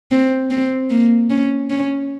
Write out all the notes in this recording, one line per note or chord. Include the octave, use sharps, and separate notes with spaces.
C4
C4
A#3
C#4
C#4